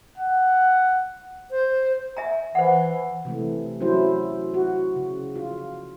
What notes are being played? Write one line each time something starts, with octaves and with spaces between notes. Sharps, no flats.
F#5
C5
E5 G#5 A#5
E3 C5 F#5
C3 E3 A3
F#3 C#4 E4 C5
F#4
C#3
F4